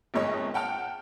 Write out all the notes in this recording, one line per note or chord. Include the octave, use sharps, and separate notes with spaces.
G1 F2 G#2 A#3 C#5 D#5
F#5 G5 A5 F6